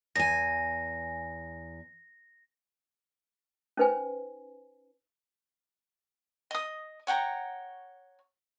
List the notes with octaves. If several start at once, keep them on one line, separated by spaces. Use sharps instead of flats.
E2 G#5 A#6
C#4 D#4 B4 C5 G#5
D#5 D#6
C#5 F#5 G5 A#5